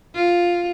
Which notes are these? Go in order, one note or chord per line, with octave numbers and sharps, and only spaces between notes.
F4